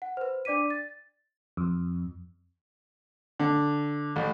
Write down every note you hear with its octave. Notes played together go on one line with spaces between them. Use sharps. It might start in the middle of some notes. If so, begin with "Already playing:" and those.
F#5
B4 C5
D4 D5 D6 B6 D#7
A6
F2
D3
A1